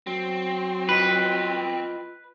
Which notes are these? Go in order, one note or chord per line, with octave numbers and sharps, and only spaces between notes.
F#3 C4
F4 B4 D#5 G5